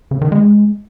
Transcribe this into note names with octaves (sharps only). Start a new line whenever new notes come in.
C#3
D#3
G#3